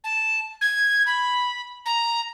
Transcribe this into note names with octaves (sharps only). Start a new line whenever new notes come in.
A5
G#6
B5
A#5